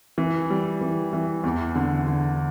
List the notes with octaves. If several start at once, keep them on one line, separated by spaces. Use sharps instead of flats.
E3
G3
E3
E3
E2
D3
D3